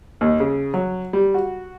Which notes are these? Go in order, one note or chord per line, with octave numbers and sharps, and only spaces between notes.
D#2
C#3
F#3
G3
F#4